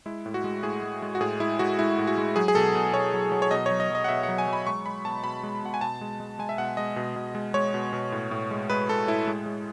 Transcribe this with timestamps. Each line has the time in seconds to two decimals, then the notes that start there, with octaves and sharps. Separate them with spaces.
0.06 G#3 E4
0.26 A2
0.34 F#4
0.44 G#3
0.63 A2 G#4
0.83 G#3
1.02 G#3
1.15 F#4
1.21 A2 G#4
1.40 G#3 E4
1.59 G#3 F#4
1.79 G#3 E4
1.98 A2
2.07 F#4
2.18 G#3
2.36 F#3 G#4
2.48 G#4
2.55 B2 A4
2.75 B2
2.93 B2 C#5
3.14 F#3
3.32 F#3
3.42 C#5
3.51 B2 D#5
3.66 F#3 C#5
3.80 D#5
3.90 F#3 D#5
4.04 F#5
4.08 B2 E5
4.23 F#5
4.28 F#3
4.38 G#5
4.48 F#3
4.53 B5
4.67 G#3 C#6
4.86 G#3 B5
5.05 B2 A5
5.24 B2 B5
5.43 G#3
5.63 B2 F#5
5.74 G#5
5.81 B2 A5
6.01 G#3
6.20 G#3
6.39 G#3 G#5
6.49 E5
6.58 B2 F#5
6.77 G#3 D#5
6.96 B2
7.16 B2
7.35 G#3
7.54 G#3 C#5
7.74 B2
7.93 B2
8.12 A2
8.31 A2
8.51 G#3
8.70 G#3 B4
8.89 G#3 A4
9.07 A2 E4
9.27 G#3
9.46 G#3